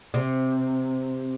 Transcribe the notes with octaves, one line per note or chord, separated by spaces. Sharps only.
C3